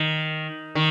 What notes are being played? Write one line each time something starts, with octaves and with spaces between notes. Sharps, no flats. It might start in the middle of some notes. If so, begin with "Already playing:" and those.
Already playing: D#3
D#3